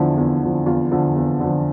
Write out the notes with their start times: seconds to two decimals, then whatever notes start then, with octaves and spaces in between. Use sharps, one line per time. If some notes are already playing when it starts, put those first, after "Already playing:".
Already playing: E2 D3 F3 E4
0.17 E2
0.42 D3 F3
0.66 E2 F4
0.91 D3 F3
1.16 E2
1.40 D3 F3